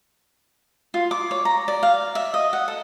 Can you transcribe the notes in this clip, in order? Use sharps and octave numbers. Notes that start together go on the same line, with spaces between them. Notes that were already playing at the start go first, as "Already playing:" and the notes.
F4
D6
C#5
A#5
D5
F5
E5
D#5
F#5
A4